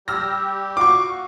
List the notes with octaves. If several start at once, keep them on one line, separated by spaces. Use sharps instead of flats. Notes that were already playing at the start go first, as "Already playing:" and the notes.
G3 G4 E6 F6 A#6
F4 F#4 C#6 D6